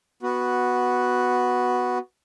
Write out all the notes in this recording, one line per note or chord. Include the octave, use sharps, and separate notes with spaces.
B3 F#4